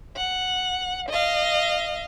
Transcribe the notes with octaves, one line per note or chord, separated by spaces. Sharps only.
F#5
D#5 F5